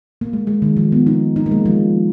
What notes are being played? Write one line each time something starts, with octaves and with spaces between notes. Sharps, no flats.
A#3
G#3
G#3
D#3
F3
B3
D#4
D#4
A#3
G#3
F3